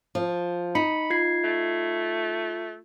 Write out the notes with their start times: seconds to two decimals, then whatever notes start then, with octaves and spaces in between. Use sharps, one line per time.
0.15 F3
0.75 D#4 B5 C#7
1.10 F4 G#6 C7
1.44 A3